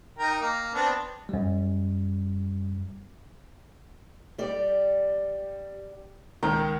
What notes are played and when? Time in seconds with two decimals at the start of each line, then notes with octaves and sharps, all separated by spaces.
0.19 D#4 A#4 G5
0.41 A#3
0.74 B3 C4 D4
1.29 F#2 G3
4.38 G3 G4 D5
6.43 C#2 D#3 G5 A#5